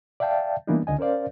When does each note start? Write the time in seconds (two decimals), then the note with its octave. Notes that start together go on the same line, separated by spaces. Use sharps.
0.20 D5 E5 F5 G5 A5
0.67 E3 G3 A#3 B3 D4 D#4
0.87 C#2 D3 D#5 G#5
0.99 C#4 A#4 C5 D5 F5